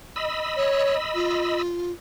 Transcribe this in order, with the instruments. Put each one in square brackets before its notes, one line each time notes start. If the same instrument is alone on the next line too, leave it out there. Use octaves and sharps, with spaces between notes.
[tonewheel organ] D#5 B5 E6
[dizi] C#5
F4